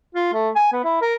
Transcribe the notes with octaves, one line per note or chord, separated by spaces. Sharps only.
F4
A3
G#5
B3
E4
A#4